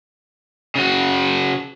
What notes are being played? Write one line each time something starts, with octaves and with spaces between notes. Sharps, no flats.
C#3 F#4